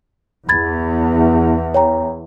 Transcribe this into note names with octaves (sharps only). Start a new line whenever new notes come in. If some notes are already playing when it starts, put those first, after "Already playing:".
E2 B5 G#6 A6
C#5 G5 A#5